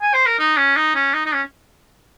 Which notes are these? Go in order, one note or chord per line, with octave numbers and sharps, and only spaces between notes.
G#5
C5
A#4
D#4
C#4
D#4
C#4
D#4
D#4
C#4